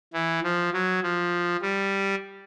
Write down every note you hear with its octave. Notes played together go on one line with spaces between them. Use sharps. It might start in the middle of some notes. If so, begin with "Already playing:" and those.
E3
F3
F#3
F3
G3